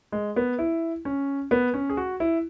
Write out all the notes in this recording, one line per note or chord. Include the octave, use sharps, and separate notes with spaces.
G#3
B3
E4
C#4
B3
C#4
G#4
F#4
E4